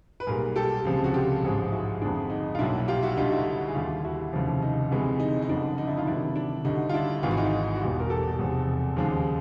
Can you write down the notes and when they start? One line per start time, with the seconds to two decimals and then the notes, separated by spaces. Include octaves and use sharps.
0.20 B4
0.27 B1 A#2 G3 G#4 A#4
0.56 G4 A4
0.85 C#2 C3 F3 G#3
1.04 F#4
1.14 F4 G4
1.43 A1 G#2 F3 G#3
1.72 E4 F#4
2.02 F2 D3 F3 G#3 D4
2.30 D#4
2.55 F4
2.59 B1 A#2 F#3 D4 E4
2.88 F4 G4
3.03 E4 F#4
3.17 D2 D3 G3 D#4 F4
3.32 E4 F#4
3.68 G#4
3.74 D#2 D3 G3 F4 G4
4.04 E4 F#4
4.33 F1 D#2 C#3 F3
4.62 D#4
4.91 D2 C3 E3 G#3
5.20 D#4
5.42 D#4
5.49 F#1 F2 D3 D4
5.78 D#4
5.87 D4 E4
5.97 D#4 F4
6.07 D2 C3 D#3 F#3 D4 E4
6.35 D4
6.65 D2 D3 G3 D#4
6.89 F4
6.94 D4 E4
7.23 G#1 G#2 E3 F4
7.31 F#4
7.37 D#4 F4
7.75 F#4
7.81 E2 B2 G3 F4 G4
8.00 A#4
8.09 G4 A4
8.39 F1 E2 C3 F3 G#3
8.97 D#2 C#3 F3 G#3